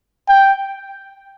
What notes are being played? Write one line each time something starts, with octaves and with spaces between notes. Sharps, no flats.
G5